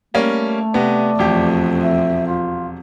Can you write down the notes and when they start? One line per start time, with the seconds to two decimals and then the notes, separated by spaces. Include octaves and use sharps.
0.14 G3 A3 A#3 C#4
0.74 C3 B3 D5
1.19 E1 F2 G4
1.83 E5
2.27 F4